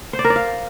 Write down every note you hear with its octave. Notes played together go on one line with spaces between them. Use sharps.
C5
D5
A#4
D5
F5